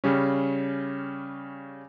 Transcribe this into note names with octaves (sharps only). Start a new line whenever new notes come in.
C#3 G3 C#4